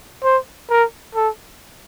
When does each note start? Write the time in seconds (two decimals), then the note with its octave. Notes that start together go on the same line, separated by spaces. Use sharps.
0.24 C5
0.70 A#4
1.15 A4